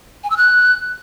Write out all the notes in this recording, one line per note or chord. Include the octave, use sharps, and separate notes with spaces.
G#5
E6
F#6